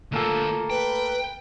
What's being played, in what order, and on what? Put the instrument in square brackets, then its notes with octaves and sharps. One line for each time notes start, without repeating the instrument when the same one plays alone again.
[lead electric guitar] D3 F4 [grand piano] A3 A#3 A4
[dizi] B4 [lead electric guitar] G5